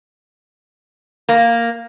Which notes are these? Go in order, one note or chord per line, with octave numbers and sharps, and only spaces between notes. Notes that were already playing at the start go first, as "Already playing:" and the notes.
A#3